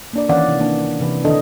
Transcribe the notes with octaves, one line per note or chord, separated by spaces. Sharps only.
A#3 D4 D5
D#3 E3 C#4 D5 F5 F#5
C3
A#3 D4
C3 E3 B4
D3 D#3 D4 A4 D#5